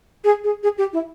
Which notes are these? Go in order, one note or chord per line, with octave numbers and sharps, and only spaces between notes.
G#4
G#4
G#4
G4
E4